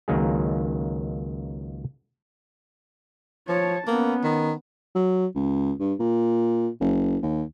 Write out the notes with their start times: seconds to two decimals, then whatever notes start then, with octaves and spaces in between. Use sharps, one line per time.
0.08 C#2 D#3 F#3 A#3 D#4 G#4
3.48 F3 C#5 A5
3.87 A#3 B3 C#4
4.23 D#3
4.96 F#3
5.35 C#2
5.80 G2
6.00 A#2
6.80 F#1
7.23 D#2